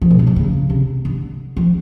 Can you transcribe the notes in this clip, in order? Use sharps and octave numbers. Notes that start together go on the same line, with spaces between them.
F3
B2
E3
D#3
C#3
C3
D3
F3